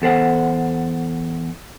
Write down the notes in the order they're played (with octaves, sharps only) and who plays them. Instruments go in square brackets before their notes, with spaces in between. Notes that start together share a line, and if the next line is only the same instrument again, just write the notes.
[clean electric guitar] E2 A4 C5 F#5